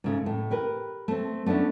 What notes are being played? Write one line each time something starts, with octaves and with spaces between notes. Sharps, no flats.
G#2 C#3 A3
A2
G4 A#4 B4
A3 C4
A3 B3 C#4 D4 E4